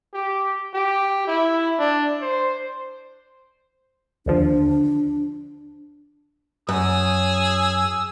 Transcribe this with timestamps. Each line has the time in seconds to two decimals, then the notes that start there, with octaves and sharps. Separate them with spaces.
0.14 G4
0.74 G4
1.27 E4
1.79 D4
2.21 C5
4.26 D#2 D3 F3 D4
6.69 F#2 G#4 D#6 E6